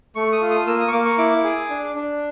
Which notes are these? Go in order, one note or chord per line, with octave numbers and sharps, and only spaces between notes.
A3 C#6
D#6
F4
D#6
A#3 E6
D#6
C#6
A#3 D6
C#6
E4 D6
G#4
D4
D4